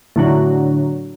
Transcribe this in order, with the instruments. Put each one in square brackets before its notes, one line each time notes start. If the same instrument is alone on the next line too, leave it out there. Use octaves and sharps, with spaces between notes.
[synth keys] A2 D3 F#3